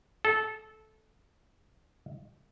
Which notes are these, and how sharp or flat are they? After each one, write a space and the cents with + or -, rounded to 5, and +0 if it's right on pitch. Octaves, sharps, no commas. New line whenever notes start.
A4 -15